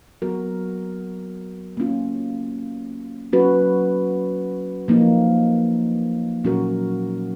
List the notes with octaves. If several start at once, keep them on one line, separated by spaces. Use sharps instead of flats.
F#3 B3 F#4 A#4
A#3 C#4 F4
F#3 C#4 F#4 B4
F3 A#3 D#4
A#2 F#3 C#4 F#4 A#4